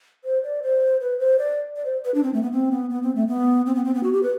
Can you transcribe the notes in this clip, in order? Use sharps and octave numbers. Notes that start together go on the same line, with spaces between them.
C5
D5
C5
B4
C5
D5
D5
C5
B4
D4
C4
A3
B3
C4
B3
B3
C4
A3
B3
C4
B3
C4
B3
F#4
G4
B4